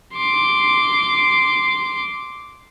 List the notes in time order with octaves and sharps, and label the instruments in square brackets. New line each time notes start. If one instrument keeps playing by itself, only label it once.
[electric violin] C6 D6